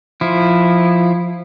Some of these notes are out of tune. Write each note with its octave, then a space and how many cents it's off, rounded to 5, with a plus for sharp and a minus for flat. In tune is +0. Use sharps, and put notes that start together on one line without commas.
F3 +0 E4 +0